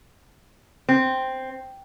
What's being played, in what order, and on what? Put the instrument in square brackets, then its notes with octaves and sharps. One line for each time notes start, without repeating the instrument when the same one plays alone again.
[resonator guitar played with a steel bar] C4